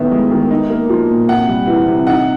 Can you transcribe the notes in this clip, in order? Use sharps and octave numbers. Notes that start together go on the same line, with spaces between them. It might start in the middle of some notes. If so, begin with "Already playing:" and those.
Already playing: A2 D#3 B3 E5
G#3
D#3
D#4
A#3
F3
A#2
C3 F#5
G3
E3
C3
D#4 F#5